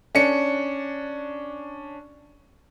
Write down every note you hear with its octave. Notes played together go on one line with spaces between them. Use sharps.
C#4 D4 C#7